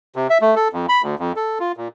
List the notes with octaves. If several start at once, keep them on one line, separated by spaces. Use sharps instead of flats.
C3
E5
A3
A4
F2
B5
D2
F2
A4
F4
A#2